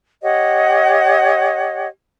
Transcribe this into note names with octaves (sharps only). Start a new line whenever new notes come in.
G4 C#5 D#5 F#5